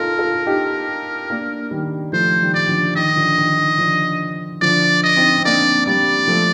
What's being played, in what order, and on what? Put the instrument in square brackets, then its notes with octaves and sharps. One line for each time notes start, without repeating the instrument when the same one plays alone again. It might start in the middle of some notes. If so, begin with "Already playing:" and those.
Already playing: [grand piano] D#4 F4 A4 [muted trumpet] A#4
[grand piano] F4 A4
D#4 G4
A#3 D4
D#3 G3
[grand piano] F3 A3 [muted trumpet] C5
[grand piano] D#3 G3
[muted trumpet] D5
[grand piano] D3 F3
[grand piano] D#3 [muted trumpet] D#5
[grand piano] D3 F3
D#3
D#3
D3 F3
[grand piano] D3 F3 [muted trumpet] D5
[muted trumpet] D#5
[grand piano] C4 D#4
C4
[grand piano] A#3 D4 [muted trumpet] D5
[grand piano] G3 A#3 [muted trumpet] D5
[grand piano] F3 A3